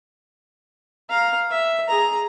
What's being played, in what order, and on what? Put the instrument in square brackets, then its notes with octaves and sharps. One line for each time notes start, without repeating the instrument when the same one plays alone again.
[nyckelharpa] F5 A#5
E5
G#4 A#5